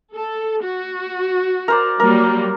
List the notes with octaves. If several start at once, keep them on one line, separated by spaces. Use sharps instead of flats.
A4
F#4
A#4 C5 D5
F#3 G3 A#3 A#4